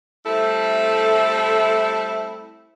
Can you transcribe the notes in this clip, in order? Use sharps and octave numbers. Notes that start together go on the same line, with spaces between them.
G3 A3 C4 E4 A4